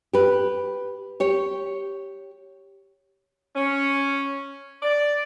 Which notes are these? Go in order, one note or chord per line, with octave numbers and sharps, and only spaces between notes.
G4 B4
G4 C#5
C#4
D5